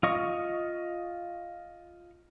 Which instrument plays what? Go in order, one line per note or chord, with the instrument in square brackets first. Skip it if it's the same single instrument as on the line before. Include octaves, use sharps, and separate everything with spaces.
[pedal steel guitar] F4 D#5 C#6